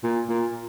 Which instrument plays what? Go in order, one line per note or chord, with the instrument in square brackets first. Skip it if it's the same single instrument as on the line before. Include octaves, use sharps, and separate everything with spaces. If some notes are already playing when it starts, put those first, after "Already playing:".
[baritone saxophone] A#2
A#2